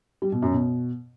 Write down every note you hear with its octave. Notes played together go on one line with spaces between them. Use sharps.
G3
B2
F#2
B2